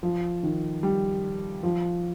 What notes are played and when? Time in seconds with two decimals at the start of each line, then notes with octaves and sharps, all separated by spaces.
0.03 F3
0.43 D#3
0.83 G3
1.63 F3